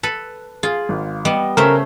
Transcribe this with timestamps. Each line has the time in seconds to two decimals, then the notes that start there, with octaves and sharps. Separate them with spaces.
0.03 A4 B4
0.63 F4 G#4
0.89 G#1
1.25 G3 B3 D#5
1.57 C#3 A3 C#4 A#4 C5 E5